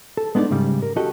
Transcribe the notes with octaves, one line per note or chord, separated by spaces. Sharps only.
A4
G#3 B3 D4 D#4 D5
G#2 C#3 G3
A#4
F#4 G4 A4 D#5